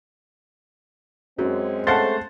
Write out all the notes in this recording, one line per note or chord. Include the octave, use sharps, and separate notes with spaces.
F#2 G#3 C4 C#4 F#4
A3 C5 F5 F#5 A5 C6 A6